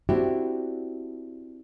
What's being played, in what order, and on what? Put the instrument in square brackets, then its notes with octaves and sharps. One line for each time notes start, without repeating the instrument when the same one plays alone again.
[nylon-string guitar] C4 D4 E4 F#4 G4